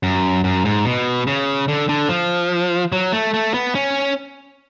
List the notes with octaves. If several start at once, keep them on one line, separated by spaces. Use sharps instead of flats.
F#2
F#2
G#2
B2
C#3
D3
D3
F3
F#3
A3
A3
B3
C#4